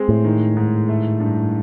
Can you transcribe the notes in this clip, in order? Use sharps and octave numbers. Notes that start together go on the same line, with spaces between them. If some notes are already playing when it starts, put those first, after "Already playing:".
Already playing: G#3 C4
A2
D#3
G#2
A3
G2